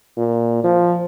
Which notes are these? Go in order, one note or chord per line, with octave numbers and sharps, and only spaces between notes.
A#2
F3